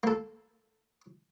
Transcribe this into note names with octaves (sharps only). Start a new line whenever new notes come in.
A#3 A4